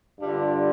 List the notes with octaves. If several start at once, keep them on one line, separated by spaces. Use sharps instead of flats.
G2 D3 G3 D4 F4